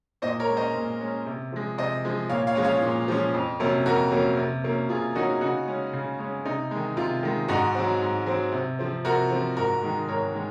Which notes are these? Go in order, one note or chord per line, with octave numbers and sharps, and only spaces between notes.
A#2 C5 D#5
A#4 C#5
G#3 C#4
C5 D#5
A#2
G#3 C#4
C3
F3 G#3
C3 C5 D#5
F3 G#3
A#2 C#5 F5
C#5 F5
F3 G#3 C#4
C#5 F5
A#2
F3 G#3 C#4
F2
C3 F#3 A#3 C#4
F2 F#4 A#4
C3 F#3 A#3 C#4
C3
F#3 A#3 C#4
C3 F4 G#4
F#3 A#3 C#4 D#4 F#4
C#3 D#4 F#4
G#3 C#4
C#3
G#3 C#4
C3 D#4
D#3 G#3
C3 F4
D#3 G#3
G#2 D#4 F#4
F#3 C4
G#2
F#3 C4
C3
F3 C4
C3 F#4 A#4
F3 C4
G#2 F#4 A#4
D#3 G#3
G#2 A#4 C#5
D#3 G#3